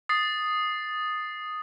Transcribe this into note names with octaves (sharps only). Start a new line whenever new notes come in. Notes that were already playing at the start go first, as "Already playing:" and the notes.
D#6 A6 C7